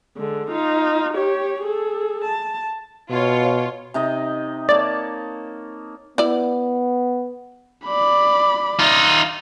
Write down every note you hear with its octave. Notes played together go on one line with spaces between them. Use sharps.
D3 G#3
D#4 F4
G4 C#5
G#4 A4
A5
B2 F4 C#5
C3 D#4 D#5
A#3 C#5 D5 A5
B3 E4 D5
D5 B5
D#4 F4